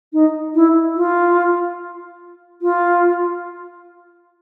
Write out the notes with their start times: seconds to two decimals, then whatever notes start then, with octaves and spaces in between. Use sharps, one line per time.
0.13 D#4
0.55 E4
0.96 F4
2.62 F4